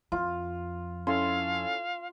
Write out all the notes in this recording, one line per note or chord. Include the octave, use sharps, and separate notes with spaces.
F2 F4
C#4 E4 A4 F5 C6